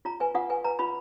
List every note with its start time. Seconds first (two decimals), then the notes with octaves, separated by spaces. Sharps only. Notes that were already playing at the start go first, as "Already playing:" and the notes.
0.05 F4 A#5
0.20 B4 G#5
0.35 F4 F#5
0.50 B4 G#5
0.64 B4 A#5
0.79 F4 B5